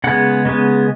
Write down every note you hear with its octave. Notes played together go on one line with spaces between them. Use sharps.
C#3 G#3 B3 F#5
C#3 G#3 B3